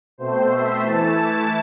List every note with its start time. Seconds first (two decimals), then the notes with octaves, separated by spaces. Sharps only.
0.18 B2 A3 C4 C5
0.50 E5
0.82 E3 A3 E4 A5